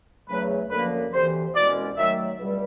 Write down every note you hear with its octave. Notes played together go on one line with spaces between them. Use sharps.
E2 C#3 F#3 A3 B4
F#2 D3 F3 A#3 B4
D2 C3 E3 C5
C2 B2 G#3 C#4 D5
D#3 F#3 A3 E5
C#2 B2 G3